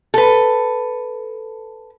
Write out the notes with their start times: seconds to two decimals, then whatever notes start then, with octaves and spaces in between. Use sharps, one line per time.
0.14 A4 B4